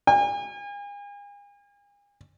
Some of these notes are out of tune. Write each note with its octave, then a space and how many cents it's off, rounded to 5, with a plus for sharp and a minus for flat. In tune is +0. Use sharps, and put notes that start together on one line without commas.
G#5 -40